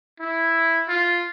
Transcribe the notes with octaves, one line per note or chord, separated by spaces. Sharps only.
E4
F4